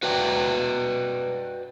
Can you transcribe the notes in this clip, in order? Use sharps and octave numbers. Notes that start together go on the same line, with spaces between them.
F#4 B4 D5 G5